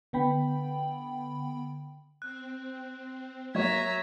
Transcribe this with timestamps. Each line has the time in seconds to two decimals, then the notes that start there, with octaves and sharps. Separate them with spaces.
0.13 D3 B3 G5 B5
2.22 C4 F#6
3.55 F#3 A#3 C#5 E5 A#5 C#6 G#6